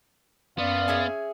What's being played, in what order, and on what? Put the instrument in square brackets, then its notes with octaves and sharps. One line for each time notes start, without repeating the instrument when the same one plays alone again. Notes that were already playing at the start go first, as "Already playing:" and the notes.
[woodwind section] F#2 D5 C6 [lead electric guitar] B3 [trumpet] F5
[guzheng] C#4 G#4 E5